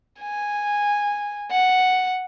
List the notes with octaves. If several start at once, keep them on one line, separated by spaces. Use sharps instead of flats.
G#5
F#5